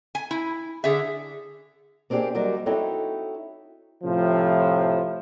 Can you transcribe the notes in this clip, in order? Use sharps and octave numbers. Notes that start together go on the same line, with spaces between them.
G#5
E4
D3 G#4 E5
A#3 C4 D4 E4 G4 G#4
D#2 F#3 G3 F#4 A#4
C4 D#4 E4 F#4 A4 C#5
A2 C3 F3